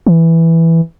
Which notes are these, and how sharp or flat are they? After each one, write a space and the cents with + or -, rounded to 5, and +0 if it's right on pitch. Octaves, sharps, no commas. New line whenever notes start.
E3 +0